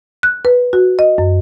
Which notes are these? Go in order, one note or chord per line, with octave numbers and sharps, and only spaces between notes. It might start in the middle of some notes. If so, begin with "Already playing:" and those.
F#6
B4
F#4
D#5
F#2